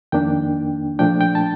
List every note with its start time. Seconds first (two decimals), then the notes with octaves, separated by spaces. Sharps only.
0.12 F2 D#3 A#3 D4 G5
0.99 A#2 F3 A3 D4 G5
1.21 G5
1.35 A5